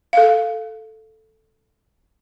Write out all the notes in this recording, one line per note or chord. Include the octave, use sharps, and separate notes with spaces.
A4 F5